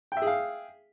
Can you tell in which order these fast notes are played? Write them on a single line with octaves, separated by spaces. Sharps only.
G5 E5 G#4 F5